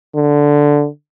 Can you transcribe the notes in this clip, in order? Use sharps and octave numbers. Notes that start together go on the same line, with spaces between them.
D3